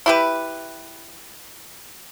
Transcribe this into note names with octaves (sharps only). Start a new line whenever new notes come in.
E4 G4 B4